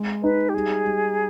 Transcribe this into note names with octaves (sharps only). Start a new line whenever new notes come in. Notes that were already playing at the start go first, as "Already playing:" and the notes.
Already playing: G#3
D#4 B4
G4
G3 G#4
G3